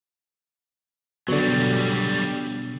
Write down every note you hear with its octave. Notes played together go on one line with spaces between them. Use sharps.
B2 D3 F#3 G3